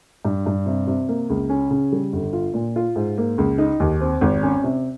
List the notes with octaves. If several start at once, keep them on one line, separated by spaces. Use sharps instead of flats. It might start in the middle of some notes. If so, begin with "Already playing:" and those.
G2
G2
C3
C3
A#3
C#2
C#4
C#3
G3
G1
F4
A#2
F4
G#2
A#3
C#2
D#4
D#2
C4
G#1
C#4
C3